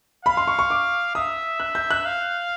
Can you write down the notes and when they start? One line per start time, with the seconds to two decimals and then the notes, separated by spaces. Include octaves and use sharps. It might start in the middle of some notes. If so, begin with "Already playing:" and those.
0.25 F5 B5
0.37 C6
0.48 C#6
0.59 C#6
0.70 D6
1.15 E5 D#6
1.60 F#6
1.75 G6
1.91 F#6
2.05 F5